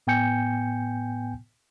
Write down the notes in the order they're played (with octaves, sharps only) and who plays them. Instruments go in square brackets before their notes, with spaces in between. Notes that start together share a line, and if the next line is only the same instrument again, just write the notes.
[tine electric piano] A2 B3 G5 G#5 G6 C#7